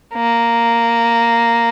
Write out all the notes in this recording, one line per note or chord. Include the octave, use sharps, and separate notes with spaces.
A#3